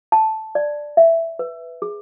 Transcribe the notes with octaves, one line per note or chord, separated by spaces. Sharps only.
A5
D5
E5
B4
G#4